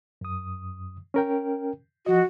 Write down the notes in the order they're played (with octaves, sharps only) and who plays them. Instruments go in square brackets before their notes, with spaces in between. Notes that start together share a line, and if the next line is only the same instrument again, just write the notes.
[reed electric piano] F#2 D#6
C#4 A#4 G5
[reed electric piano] F3 D#5 [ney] F#4